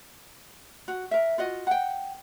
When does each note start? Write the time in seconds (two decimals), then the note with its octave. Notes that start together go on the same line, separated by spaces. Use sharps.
0.88 F#4
1.11 A#4 E5
1.38 F4 F#4 D#5
1.67 F#5 G5